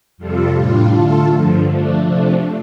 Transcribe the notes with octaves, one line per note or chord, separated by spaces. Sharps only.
F2 C3 G3 F4 A4
A2 G3 D4 F4
D3 A3 F4 A4
G2 D3 F3
F3 A3 D4
C3 F3 A3 D4